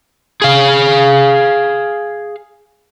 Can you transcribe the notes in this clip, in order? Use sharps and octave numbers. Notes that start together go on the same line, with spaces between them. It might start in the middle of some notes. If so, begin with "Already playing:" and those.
G#4 F5